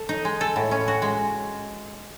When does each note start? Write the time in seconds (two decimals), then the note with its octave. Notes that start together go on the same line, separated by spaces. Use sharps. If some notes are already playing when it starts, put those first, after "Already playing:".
Already playing: A4
0.09 D#4
0.25 G#3
0.41 A4
0.56 A2
0.71 C#4
0.88 F#4
1.02 G#3